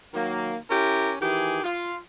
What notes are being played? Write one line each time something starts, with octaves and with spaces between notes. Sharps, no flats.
D#3 F#3 A#3
C#4 E4 G4 A#4
D#3 E3 G4 G#4
F4